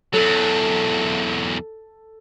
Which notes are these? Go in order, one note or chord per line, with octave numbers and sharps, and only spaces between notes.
E2 F#3 A4